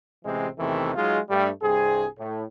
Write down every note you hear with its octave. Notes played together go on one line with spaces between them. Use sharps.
A1 C3 E3 G#3 C4
E2 C3 D#3 E3 A3 C4
F#3 G#3 D#4 F4 G#4
G2 G3 A3
C2 G2 C4 G#4
A2